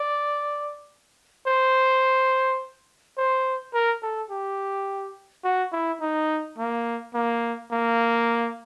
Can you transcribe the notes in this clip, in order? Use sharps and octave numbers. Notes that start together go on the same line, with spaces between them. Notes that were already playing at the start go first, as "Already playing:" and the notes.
Already playing: D5
C5
C5
A#4
A4
G4
F#4
E4
D#4
A#3
A#3
A#3